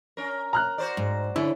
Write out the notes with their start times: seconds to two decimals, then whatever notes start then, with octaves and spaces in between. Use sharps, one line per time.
0.17 C#4 A#4
0.53 A#5 F6 F#6
0.78 F#4 C5 D5
0.97 G#2
1.36 D3 C#4 E4 E5